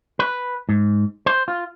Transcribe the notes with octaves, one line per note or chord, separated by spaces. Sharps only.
B4
G#2
C5
F4